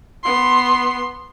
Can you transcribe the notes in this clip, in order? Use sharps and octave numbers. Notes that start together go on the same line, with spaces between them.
B3 C6